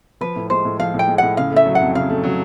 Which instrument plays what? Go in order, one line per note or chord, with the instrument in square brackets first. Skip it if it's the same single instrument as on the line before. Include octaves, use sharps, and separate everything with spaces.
[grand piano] F3 [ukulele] B4
[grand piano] A2
[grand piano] G#3 [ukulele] C5
[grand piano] A2
[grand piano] F3 [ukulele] F5
[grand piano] A2
[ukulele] G5
[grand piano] G#3
[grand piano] A2 [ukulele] F#5
[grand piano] C#3 [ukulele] F5
[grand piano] A3 [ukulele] E5
[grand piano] F#3
[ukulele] F#5
[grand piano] F2
[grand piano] C#3 [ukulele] F5
[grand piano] A3
F#3